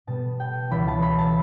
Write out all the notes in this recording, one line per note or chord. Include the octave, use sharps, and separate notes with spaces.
B2 G3 B3 A5
G5
C#2 C#3 E3 G3 B5
A5
B5
A5